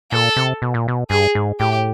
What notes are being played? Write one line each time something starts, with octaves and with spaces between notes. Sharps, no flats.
A#2 A4
C3
B2
A#2
B2
G2 G#4
G#2
A2 G4